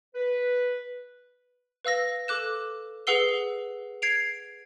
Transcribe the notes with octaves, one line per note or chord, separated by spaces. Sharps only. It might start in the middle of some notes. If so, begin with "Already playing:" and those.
B4
B4 F5 E6 A#6
A4 D6 F#6 E7
G#4 B4 F#5 E6 C7 G7
G#6 C7 D7 F7